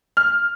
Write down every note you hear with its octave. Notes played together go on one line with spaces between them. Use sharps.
F6